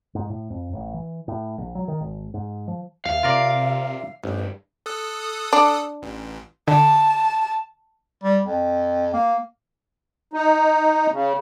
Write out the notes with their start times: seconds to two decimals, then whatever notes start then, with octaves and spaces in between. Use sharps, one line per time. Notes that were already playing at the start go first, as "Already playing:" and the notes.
0.15 G#2
0.30 A2
0.50 F2
0.73 A1
0.94 E3
1.28 A2
1.58 A#1
1.75 F#3
1.88 D#3
2.00 G#1
2.34 G#2
2.68 F3
3.05 D#2 E5 F5
3.23 C3 F4 A#4 D5
4.24 A1 G2 C5
4.86 A4 D#6 F#6
5.53 D4
6.02 A1
6.68 D3 A5
8.24 G3
8.45 F2
9.14 A#3
10.33 D#4
11.12 C#3